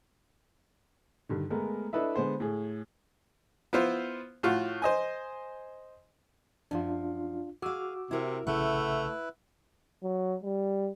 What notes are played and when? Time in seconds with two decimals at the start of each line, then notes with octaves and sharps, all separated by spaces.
1.29 G2 D3 D#3
1.50 G#3 A3 B3 A#4
1.93 D4 E4 A4 B4 D#5 E5
2.16 D3 G#3 B3 G#4 C5
2.40 A2 G#4
3.73 B3 E4 F4 C5
4.43 A2 F4 F#4
4.82 C5 D#5 G#5
6.71 F#2 F3 D4 F4
7.62 F#4 G#4 F5 D6 E6
8.11 C3 E4 A#4 E5
8.47 A#1 C#3 A3 E4 B4 F#5
10.03 F#3
10.43 G3